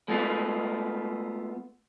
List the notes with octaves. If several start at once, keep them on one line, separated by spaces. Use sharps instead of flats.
G#3 A3 B3 F4